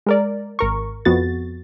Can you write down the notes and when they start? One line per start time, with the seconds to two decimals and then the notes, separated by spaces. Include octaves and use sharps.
0.06 G#3 A#4 D5
0.59 G#1 A#4 C#6
1.05 F2 B3 F#4 A6